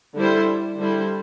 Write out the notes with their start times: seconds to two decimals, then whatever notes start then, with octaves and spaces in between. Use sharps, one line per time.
0.17 D3 G3 E4 A4 C5
0.80 D3 G3 E4 C5